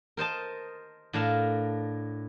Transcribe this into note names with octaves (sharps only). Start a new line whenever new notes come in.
A#4 C5 D#5 A5
A2 D4 A#4 F5 A5